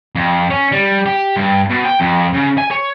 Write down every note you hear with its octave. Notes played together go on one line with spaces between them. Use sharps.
F2
C#4
G3
G4
G2
B2
G5
F2
C#3
G#5
C#5